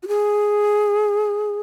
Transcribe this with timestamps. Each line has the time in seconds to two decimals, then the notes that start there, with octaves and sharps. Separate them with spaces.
0.03 F#4
0.08 G#4